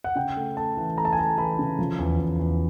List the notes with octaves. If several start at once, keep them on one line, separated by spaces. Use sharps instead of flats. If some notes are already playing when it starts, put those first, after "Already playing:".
F#5
C#3 G5
A3
A3 A5
E3
A3 A#5
A5
G#5
A3 A5
E3 B5
C#3
F3
E2
E2
E2